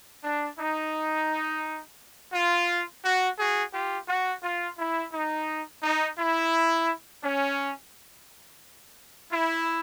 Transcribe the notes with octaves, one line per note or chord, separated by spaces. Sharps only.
D4
D#4
F4
F#4
F#4 G#4
F4 G4
F#4
F4
E4
D#4
D#4
E4
C#4
E4